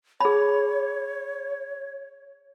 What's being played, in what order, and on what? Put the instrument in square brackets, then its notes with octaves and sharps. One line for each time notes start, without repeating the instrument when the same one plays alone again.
[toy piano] G#4 B5 [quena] C#5